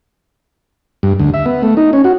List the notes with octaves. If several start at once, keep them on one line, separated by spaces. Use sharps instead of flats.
G2
D2
E5
B3
A3
D#4
C#4
F#4